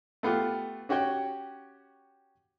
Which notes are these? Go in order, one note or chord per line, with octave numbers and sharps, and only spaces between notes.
A3 B3 F4 G4
C#4 F#4 G4 C#5 G5